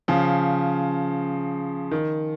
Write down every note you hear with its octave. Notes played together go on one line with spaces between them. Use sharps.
C#3 F3
D#3